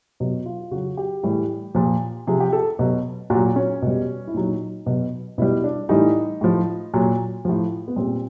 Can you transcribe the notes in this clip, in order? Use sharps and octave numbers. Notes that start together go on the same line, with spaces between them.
B2 F#3
F4
C#3 F#3 F#4
G4
A2 E3 G3
A#2 F3
C3 F3 G#4
G4
A4
B2 F#3
A#2 F#4
F#3
C#4
B2 G3
E4
A#2 F#3 D#4
B2 F#3
B2 G3 E4
D4
A2 E3 G3 D#4
A2 F3
A#2 F#3
A2 F3
B3
A#2 G3 C4